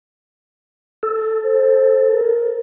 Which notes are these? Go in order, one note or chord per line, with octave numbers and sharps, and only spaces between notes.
A4
C5
A#4